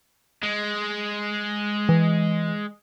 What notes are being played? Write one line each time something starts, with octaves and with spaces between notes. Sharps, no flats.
G#3
E3